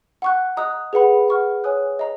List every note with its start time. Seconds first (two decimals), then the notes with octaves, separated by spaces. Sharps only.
0.22 F#5 C#6 F#6
0.57 D#5 A#5 D#6 F#6
0.93 G#4 B4 F#5 B5
1.28 F#5 C#6 F6
1.64 C#5 G#5 D#6 F#6
1.99 D#5 A#5